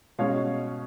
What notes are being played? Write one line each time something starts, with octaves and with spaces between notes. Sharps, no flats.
B2 G#3 C#4 C#5 F5